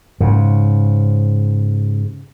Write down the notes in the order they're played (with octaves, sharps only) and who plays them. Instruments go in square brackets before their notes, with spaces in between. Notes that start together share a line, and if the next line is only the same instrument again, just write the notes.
[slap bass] G#2 C#3